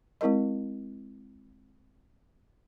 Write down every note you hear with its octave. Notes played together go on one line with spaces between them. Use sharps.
G#3 C4 E4 A#4 D#5